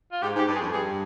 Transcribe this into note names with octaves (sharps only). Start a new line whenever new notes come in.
F4
G#2 G4
G#2 G4
G2
G#4
F2
G2 G#4